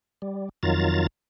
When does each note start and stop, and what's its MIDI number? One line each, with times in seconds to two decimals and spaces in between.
0.22 0.49 55
0.63 1.07 41
0.63 1.07 51
0.63 1.07 54
0.63 1.07 65
0.63 1.07 82
0.63 1.07 93